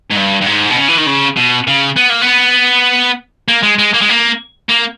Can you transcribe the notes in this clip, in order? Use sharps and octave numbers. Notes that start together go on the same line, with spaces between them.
G#2
G2
G2
G#2
B2
C#3
E3
D#3
C#3
B2
C#3
B3
A#3
B3
A#3
G#3
G#3
A#3
G#3
A#3
A#3